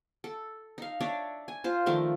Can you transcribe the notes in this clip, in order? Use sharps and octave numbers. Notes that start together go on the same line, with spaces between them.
A4
D#4 F5
D4 C#5 D5 E5
G#5
F4 C5
D#3 F3 A3 D4